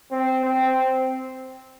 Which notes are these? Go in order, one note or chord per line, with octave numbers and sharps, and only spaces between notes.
C4
C4